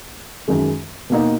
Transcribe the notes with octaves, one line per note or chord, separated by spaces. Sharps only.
F#2 D#3 G#3
B2 A#3 D#4 F#4